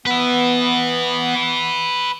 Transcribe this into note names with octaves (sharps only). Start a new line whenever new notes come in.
B3 B4 E5